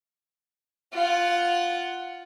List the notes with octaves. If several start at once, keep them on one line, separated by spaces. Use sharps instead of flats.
F4 F#5